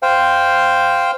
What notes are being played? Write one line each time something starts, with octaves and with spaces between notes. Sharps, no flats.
C5 F5 G5